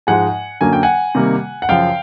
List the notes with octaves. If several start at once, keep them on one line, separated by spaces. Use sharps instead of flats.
G#2 F3 G#3 F#5 G#5
F#2 D3 F#3 A#3 G#5
G5
F#5 G#5
C3 D#3 G3 A#3
F#5
F#2 C#3 F3 F5 G5